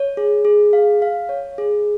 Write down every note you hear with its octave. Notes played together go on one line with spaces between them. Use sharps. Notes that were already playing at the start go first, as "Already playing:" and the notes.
Already playing: C#5
G#4
G#4
F5
F5
C#5
G#4